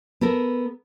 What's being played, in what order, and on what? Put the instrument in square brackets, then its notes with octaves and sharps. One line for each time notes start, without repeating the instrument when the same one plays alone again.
[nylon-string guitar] B3 A4 A#4